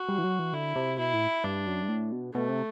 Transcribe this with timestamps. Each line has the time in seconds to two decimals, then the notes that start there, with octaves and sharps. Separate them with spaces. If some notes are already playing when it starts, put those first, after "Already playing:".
Already playing: F#4
0.09 G3
0.18 E3
0.24 F#3
0.39 E3
0.53 D3 E4
0.76 C3
0.99 B2 E4
1.14 A2
1.44 G2 D4
1.66 F#2
1.83 G2
1.89 A2
2.12 B2
2.34 B2 A3
2.49 C3